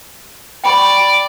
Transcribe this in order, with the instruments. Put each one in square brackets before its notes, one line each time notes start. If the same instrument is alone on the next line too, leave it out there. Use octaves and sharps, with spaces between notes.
[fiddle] D5 [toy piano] G5 B5 C#6